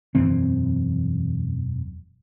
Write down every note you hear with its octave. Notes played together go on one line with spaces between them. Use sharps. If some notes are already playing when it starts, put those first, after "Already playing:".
E1 F#2 E3 C4